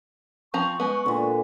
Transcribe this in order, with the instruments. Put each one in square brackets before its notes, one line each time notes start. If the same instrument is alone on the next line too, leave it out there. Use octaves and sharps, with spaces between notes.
[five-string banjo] F3 C4 A#5 [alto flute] C#6
[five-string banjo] G#3 B3
[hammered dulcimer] A#2 D3